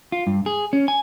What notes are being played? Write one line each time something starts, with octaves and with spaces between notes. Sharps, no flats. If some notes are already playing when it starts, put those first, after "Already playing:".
F4
G2
G#4
C#4
G#5